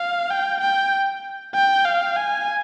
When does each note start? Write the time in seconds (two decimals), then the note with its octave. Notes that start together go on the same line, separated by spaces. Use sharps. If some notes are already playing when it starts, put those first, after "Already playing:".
Already playing: F5
0.30 G5
0.61 G5
1.55 G5
1.85 F5
2.16 G#5